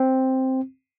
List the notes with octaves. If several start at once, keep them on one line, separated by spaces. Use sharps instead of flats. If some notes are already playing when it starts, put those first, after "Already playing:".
Already playing: C4